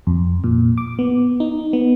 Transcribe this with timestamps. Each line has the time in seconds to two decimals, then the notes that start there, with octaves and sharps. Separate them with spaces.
0.07 F2
0.44 A#2
0.78 D6
0.99 B3
1.40 D#4
1.73 B3